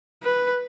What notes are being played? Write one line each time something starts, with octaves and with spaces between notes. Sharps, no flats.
B4